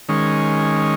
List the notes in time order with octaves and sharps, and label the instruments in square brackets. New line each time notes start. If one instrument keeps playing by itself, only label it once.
[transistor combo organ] D#3 G#3 C#4